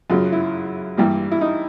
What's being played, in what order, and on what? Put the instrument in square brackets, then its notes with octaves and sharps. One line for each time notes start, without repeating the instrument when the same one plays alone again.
[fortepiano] F#2 C#3 F#3 F4
E4
G2 E3 G3 A#3
E4
D#4